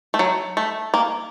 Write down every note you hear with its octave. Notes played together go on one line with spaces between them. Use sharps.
A3
F#3
A3
A#3